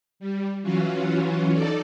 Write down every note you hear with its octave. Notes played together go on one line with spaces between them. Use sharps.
G3
E3 F#3 C#4 F4 F#4
D#4 A4 D5